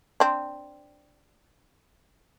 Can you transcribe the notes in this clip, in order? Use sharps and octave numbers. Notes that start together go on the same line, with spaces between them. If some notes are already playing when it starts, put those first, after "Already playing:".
C4 D4